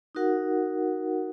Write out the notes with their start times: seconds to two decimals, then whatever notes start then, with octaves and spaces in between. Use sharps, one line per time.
0.15 D#4 F#4 A#4 F#5